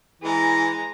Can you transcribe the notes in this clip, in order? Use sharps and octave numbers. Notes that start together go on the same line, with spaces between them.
E3 G#3 A#5